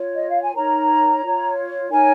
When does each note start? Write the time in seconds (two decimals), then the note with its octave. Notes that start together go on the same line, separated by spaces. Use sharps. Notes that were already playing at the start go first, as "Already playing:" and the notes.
Already playing: F4 C#5
0.15 D#5
0.28 F5
0.41 G#5
0.54 D#4 A#4 C#5 A#5
1.22 F4 C#5
1.90 D#4 A#4 C#5 G#5